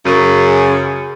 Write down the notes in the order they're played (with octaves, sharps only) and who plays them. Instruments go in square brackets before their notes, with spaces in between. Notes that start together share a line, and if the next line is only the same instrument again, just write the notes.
[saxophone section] F#2 C#3